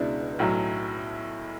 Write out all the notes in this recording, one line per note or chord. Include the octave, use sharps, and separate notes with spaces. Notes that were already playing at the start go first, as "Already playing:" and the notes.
Already playing: C#2 B2 G#3 D4 E4
B1 A2 F#3